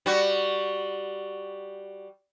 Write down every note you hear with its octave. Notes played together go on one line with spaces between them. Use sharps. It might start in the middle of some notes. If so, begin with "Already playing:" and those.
G3 F#4